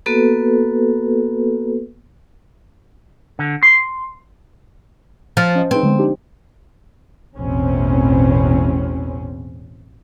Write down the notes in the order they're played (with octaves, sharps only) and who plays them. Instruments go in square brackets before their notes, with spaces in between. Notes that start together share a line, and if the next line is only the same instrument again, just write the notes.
[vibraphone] A#3 B3 F#4 A4 B4
[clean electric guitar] D3
C6
[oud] F3 [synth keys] F6 A6 C7
[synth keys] C#4 D#5
[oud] C4 [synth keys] D#4 G#4 B4
[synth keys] D3 G#3 B3
D4 D#4 G4
[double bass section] A1 E2 B2 C4 C#4